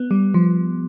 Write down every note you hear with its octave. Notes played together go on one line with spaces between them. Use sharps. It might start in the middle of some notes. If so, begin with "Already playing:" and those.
Already playing: B3
G3
F3